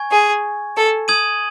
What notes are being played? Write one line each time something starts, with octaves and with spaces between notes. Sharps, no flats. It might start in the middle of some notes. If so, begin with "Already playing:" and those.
Already playing: G#5 C#6 G#6
G#4
A4
D#6 G#6 D#7 F#7